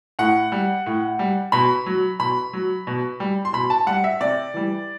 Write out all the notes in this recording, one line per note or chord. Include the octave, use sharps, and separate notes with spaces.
A2 F#5
G3
A2
G3
B2 B5
F#3
B2 B5
F#3
B2
G3
C6
B2 B5
A5
G3 F#5
E5
C3 D5
E3 G3